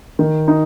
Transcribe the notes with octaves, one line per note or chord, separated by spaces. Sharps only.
D#3
D#4